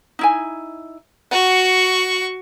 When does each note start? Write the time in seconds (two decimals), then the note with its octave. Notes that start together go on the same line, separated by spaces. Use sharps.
0.19 D#4 E4 G#5
1.31 F#4 F#5 C#6